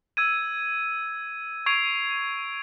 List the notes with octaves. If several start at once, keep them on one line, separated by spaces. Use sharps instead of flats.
E6 G#6 D#7
C#6 G#6 C7 D7 F7